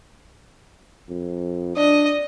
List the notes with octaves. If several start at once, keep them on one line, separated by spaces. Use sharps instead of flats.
F2
D4 D5 D#5